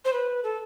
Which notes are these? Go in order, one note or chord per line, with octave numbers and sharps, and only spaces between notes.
C5
B4
A4